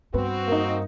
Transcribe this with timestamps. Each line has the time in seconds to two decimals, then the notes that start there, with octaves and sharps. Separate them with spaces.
0.14 G2 B3 C4 F#4
0.48 A#3 D#4